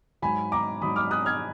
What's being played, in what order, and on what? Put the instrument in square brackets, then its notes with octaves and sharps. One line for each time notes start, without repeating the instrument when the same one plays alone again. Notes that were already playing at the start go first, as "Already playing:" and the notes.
[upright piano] G#2 F#3 G#5 B5
A#5 D6
G#2 F#3 B5 D#6
D6 F6
D#6 F#6
F6 G#6